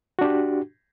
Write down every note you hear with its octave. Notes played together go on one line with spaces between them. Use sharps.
D4 F#4 G4